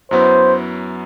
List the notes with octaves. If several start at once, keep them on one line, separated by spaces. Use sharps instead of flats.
F#2 F#3 B3 E4 C5